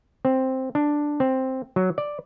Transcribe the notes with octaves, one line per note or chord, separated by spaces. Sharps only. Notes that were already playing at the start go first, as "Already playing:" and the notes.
C4
D4
C4
F#3
D5